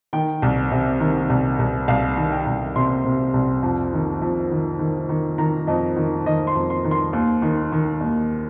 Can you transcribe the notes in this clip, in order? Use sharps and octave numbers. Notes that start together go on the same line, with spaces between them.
D#3 G5
C2
C3
D#3
C2
C2
C2 F5
D#3
G5
C2
C3 C6
C3
C2
F2
D#3
F2
D#3
D#3
D#3
D#3 A#5
F2 D#5
D#3
D#3 D#5
C6
F2
C6
D#3
C6
D#2
D#3
D#3
D#2